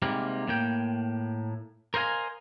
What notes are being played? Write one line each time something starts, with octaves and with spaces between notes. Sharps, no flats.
G#2 C3 G3 A#3
A2 A#3 G5
A#4 C5 D#5 F5 G#5